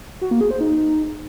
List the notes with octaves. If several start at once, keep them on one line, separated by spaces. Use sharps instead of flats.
F#4
A#3
G#4
C5
D#4